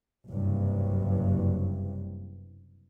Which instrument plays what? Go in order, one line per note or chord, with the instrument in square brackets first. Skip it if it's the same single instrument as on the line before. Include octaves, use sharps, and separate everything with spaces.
[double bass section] F#1 C2 G2